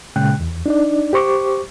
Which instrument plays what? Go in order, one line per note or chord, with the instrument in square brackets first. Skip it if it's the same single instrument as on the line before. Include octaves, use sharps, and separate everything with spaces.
[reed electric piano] A#2 C#3 G#3 G5 F#6
E2
D4 D#4 D5
G4 C5 C#6 D6